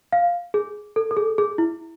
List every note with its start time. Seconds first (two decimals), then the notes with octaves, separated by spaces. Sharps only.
0.12 F5
0.54 G#4
0.96 A4
1.11 A4
1.17 G#4
1.38 G#4
1.58 E4